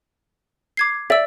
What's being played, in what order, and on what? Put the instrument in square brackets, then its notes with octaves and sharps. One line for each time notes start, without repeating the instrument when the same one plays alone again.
[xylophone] D6 G#6 C7
[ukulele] D5 E5 [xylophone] E6 B6